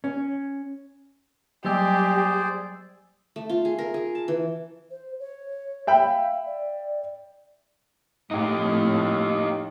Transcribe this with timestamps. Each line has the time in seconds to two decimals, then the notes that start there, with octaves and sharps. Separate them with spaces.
0.04 C#4
1.65 F#3 G3 G4 G#4 C5 D5 E6
3.36 A3
3.50 F4
3.65 G#4
3.79 A#4
3.94 G#4
4.15 A5
4.28 E3
4.91 C5
5.20 C#5
5.87 E5 G5 B5
6.05 F5
6.46 D5
8.31 F2 A2 D#4 G4